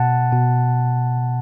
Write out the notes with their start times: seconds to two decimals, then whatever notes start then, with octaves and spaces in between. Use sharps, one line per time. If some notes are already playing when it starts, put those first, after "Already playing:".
Already playing: B2 F#5 A5
0.32 B2